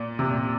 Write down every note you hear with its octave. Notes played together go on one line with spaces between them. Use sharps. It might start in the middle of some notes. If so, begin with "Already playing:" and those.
Already playing: A#2
C3
A#2